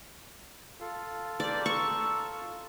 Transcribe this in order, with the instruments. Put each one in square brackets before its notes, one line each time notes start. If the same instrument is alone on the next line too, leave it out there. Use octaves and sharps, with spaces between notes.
[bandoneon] F4 A4 F5
[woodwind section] A#3 G4 [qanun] D5
[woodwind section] A5 A#5 E6 [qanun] C#6